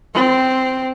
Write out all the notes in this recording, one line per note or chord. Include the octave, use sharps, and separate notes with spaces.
C4